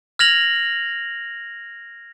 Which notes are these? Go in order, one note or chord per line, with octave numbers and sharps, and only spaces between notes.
F6 G#6 A#6 F7 F#7